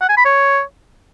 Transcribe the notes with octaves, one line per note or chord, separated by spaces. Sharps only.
F#5
G#5
B5
C#5